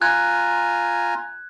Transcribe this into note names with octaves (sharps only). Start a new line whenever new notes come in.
F4 G#5 A#5 F#6 G#6